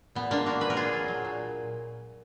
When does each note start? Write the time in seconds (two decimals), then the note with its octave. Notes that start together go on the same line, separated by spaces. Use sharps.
0.15 A#2 B3
0.31 G#3 A#3 D4
0.46 G#3 F#4 A#4
0.61 A#2 B4
0.70 A#4
0.77 A#2 F4 G#4
0.93 F#3
1.08 F#3
1.25 A#2